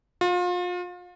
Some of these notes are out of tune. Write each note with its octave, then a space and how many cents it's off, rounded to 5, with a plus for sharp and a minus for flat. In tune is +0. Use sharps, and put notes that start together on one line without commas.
F4 +35